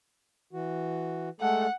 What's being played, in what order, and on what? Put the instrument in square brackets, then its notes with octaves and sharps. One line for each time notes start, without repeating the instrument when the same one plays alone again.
[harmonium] E3 F#4
[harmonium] G#3 A3 A4 [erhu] F#5